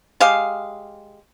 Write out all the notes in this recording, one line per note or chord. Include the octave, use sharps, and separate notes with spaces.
G#3 G4 F5